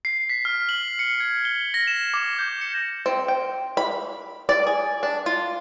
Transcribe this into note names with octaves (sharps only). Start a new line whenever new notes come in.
C7
B6
F6
F#7
C#7
G#6
G7
A#6
E7
D6
G6
C#7
C4
G5
B5
D5
G#4
D4
F4